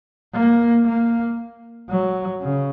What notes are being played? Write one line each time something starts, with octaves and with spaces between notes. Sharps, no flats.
A#3
A#3
F#3
C#3